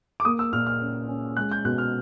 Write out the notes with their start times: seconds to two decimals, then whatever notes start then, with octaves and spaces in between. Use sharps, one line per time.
0.20 D6
0.25 A#3 D#6
0.39 E6
0.53 A#2 F6
0.67 F6
0.81 C#4
1.08 C#4
1.37 G#3 F#6
1.51 G6
1.65 B2 F#6
1.78 F6